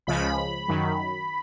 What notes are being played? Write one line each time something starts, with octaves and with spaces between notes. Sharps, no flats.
C#2 C#3 F3 G#3 B5
F#2 D#3 F#3